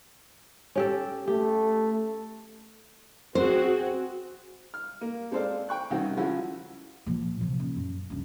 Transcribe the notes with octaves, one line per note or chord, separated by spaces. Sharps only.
C#4 G4 A4
A3 G4
C4 F#4 G#4 C5
F6
A#3
G#3 C4 A4 C5 D5 F5
G5 C#6 F#6
C2 C3 D#3 C4 C#4 F#4
C#3 F3 G#3 C#4 E4 F#4
A#2 F3
C3 F3
D#1
F#2
C#2 G2